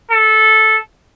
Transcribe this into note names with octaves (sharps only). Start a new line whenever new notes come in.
A4